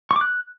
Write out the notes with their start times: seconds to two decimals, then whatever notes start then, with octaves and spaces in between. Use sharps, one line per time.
0.11 C#6
0.16 D6
0.21 F#6